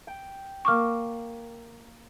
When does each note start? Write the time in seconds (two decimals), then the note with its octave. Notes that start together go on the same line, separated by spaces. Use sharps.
0.07 G5
0.65 A#3 C#6 D6 F6 E7